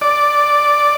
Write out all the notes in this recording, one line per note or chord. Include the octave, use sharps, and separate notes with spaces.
D5